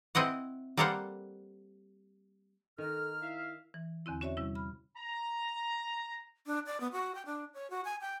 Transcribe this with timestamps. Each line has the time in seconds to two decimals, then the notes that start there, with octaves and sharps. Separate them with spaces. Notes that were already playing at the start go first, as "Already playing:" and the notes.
0.15 C4 E4 D#5 F#5
0.77 G3 A#3 A4 A#4 C5 F#5
2.78 D#3 A4 A#5 F6
3.22 E4 E5 F5
3.74 E3
4.06 E2 D3 C4 E4
4.21 C#4 F#4 C#5 D5 E5
4.37 C3 G3 C#4 E4
4.55 B5 F6
4.96 A#5
6.46 D4
6.66 D5
6.80 B3
6.92 F#4
7.15 G5
7.26 D4
7.54 C#5
7.70 F#4
7.85 G#5
8.01 G5